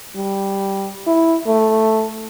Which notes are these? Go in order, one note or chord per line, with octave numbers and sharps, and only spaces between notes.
G3
E4
A3